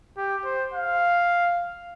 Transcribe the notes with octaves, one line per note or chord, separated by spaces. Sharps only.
G4
C5
F5